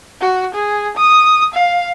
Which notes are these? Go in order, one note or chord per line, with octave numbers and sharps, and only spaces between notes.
F#4
G#4
D#6
F5